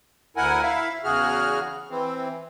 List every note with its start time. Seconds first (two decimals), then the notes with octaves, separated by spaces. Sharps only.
0.37 D2 E4 A#4 F#5 G#5
0.63 E4 E5 F5
1.04 E2 C#3 F#4 G#4 F6
1.90 E3 C4